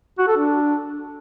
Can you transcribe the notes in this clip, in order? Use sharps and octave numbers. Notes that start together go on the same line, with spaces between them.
F#4
A4
D4